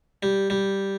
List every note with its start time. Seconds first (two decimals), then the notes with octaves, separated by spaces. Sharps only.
0.23 G3
0.50 G3